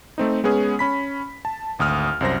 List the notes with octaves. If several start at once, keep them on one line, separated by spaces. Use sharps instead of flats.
A3 C4 D#4
G#3 B3 C#4 G#4
C#4 B5 B6
A5
G#1 D2 D#6 F6
C2 F#2 C5 A#6